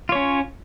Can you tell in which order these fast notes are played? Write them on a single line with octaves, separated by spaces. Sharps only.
F4 C#5 C#4